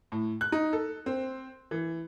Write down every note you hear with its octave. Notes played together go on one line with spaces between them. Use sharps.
A2
F#6
D#4
A4
C4
E3